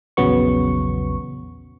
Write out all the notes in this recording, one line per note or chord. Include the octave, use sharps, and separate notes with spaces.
A#1 E2 C#3 F#3 B3 C#6